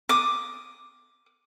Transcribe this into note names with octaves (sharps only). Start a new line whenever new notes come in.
D6 D#6